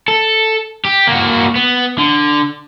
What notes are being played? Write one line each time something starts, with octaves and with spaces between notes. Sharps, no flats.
A4
G4
A#3 F#4
B3
D3